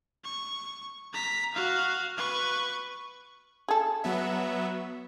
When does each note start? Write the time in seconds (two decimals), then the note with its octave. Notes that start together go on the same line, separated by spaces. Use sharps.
0.24 C#6
1.13 A#5 B6
1.54 F#4 F5
2.17 B4 C#6
3.68 G#4 A4
4.04 F#3 B3 E5